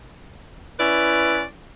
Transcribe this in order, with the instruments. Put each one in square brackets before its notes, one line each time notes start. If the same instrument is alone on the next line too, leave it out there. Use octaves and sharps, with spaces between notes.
[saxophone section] C#4 E4 B4 D5